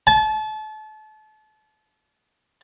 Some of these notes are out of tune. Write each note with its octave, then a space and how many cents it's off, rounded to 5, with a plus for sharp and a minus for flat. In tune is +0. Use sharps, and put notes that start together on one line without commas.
A5 -35